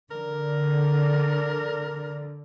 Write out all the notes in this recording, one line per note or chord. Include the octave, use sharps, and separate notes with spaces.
D3 A#4